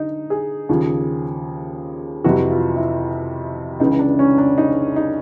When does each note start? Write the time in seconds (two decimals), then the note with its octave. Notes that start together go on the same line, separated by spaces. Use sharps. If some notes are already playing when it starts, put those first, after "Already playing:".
Already playing: D3 D#4
0.30 G#4
0.69 D#2 C#3 F3
2.24 F2 C3 E3 F#4
2.50 F4
2.76 E4
3.80 C#2 C#3 E3 D#4
3.99 D4
4.19 C#4
4.38 D4
4.58 D#4
4.96 D#4